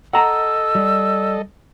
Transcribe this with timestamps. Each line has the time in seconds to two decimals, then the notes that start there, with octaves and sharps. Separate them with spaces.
0.13 A4 D#5 F#5 A#5 E6
0.75 G3